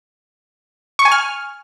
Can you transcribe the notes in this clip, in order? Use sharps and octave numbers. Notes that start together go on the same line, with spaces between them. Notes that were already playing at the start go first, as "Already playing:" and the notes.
C#6
G#5
F6